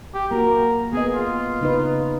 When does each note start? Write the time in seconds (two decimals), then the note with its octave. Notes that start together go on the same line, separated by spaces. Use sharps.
0.14 G4
0.31 A#3 F#4 A#4
0.93 B3 G#4 D#5
1.15 F4
1.61 C#3 D#4 B4